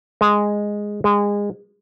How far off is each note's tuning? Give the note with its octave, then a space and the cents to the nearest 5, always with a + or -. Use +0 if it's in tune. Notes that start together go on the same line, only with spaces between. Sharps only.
G#3 -5
G#3 -25